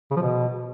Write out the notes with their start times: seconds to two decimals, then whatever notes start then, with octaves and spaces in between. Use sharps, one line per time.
0.11 C#3
0.16 F3
0.22 B2